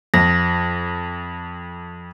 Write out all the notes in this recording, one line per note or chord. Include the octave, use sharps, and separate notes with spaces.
F2 A#6